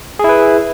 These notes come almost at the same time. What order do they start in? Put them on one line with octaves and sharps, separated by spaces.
G#4 E4 B4